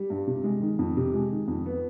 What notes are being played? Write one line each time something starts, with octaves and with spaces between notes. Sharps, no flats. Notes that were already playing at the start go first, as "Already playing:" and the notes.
Already playing: G3
G2
C3
G#3
D#3
F2
C3
G#3
D#3
F2
B3